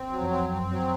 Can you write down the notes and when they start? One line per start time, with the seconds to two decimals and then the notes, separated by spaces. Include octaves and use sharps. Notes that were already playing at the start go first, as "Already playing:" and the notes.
Already playing: C4
0.10 F#3
0.20 F2
0.30 C4
0.50 F#2 C4
0.70 F#3